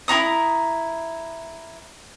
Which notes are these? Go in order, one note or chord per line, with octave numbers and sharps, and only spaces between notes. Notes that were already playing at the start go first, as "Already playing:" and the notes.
E4 F4 A#5 D#6